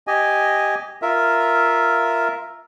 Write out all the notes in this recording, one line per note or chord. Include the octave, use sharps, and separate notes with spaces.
G4 D#5 G#5
F4 A#4 E5